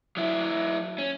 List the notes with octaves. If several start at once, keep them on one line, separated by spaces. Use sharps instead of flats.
F#3 E4
C#4